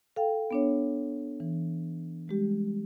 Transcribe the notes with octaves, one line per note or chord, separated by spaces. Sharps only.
A4 F5 G5
B3 D4 C#5
E3
G3 G#3 G4